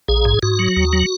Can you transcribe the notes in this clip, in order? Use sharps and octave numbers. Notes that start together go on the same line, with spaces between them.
A#1 G#4
G#2
G#2 F#4
F#3
D#2
F#3